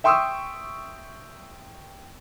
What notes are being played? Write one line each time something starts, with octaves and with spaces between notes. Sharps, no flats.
E5 G5 C6 C#6 D#6 E6